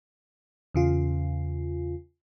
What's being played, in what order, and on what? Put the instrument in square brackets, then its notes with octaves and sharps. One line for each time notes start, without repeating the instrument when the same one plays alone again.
[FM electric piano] E2 C#3 F4